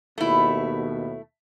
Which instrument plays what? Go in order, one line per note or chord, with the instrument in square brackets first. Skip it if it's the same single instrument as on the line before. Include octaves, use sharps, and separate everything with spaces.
[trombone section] D#2 B2 [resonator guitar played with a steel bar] A3 E4